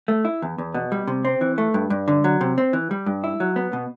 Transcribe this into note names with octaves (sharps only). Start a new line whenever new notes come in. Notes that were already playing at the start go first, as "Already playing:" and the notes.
A3
E4
E2
E2
B2
G3
C3
C4
E3
A3
G2
G2
D3
F#3
C3
C4
E3
G3
G2
E4
F#3
B3
B2